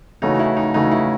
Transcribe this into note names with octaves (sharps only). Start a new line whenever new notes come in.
C#3 E3 A3 C#4 D#4 F#4
E4
D#4
C#3 E3 A3 C#4 D#4 F#4
E4